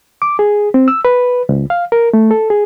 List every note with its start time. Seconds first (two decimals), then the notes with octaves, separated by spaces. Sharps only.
0.22 D6
0.39 G#4
0.74 C4
0.88 E6
1.05 B4
1.49 C#2
1.70 F5
1.92 A#4
2.13 A3
2.31 A4
2.50 G#4